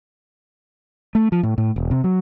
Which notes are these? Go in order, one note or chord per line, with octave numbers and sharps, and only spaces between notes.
A3
F3
A2
A2
E1
C3
F#3